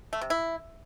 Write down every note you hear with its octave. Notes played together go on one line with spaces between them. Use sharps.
A3
C3
E4